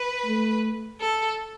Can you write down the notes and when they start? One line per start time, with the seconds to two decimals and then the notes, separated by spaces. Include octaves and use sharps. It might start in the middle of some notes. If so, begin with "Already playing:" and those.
Already playing: B4
0.26 A3
1.00 A4